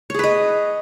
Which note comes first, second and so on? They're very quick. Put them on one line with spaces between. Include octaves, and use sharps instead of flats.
C#5 G#4 B4 D#5